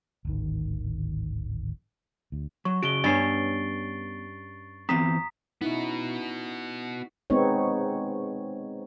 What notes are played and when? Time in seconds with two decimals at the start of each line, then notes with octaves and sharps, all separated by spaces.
0.25 D1 G#1 D#3
2.32 D2
2.65 F#3 C#6
2.83 C#3 F#4 D7 G7
3.04 G2 B3 C#4 C#5 G#5 A6 C7
4.89 E3 B3 C4 A#5 D#6 B6
5.62 B3 C#4 D#4 E4 F#4
7.30 G#3 B3 C4 D#4 C#5